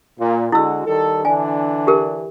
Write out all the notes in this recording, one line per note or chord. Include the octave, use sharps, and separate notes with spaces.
A#2
D3 G#3 E4 F#4 E6
D#3 G3 A4
D3 E3 D4 G#5
G4 A#4